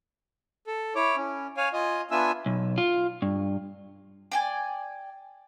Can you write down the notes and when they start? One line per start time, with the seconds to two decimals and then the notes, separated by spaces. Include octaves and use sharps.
0.67 A4
0.95 E4 C#5 D6
1.16 C#4
1.57 C#5 F5 G#5
1.73 F4 D#5 G#5
2.11 B3 D4 F4 E5 G#5 E6
2.46 B1
2.78 F4
3.22 G2
4.32 D5 G5 G#5